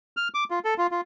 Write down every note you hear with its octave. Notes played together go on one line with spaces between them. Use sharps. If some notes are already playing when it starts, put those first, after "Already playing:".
F6
D6
F4
A4
F4
F4